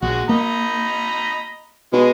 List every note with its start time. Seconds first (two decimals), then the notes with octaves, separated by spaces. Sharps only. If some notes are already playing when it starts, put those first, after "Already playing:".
0.02 A#1 G#3 F#4
0.29 A#3 D#5 A#5 B5
1.93 B2 G#3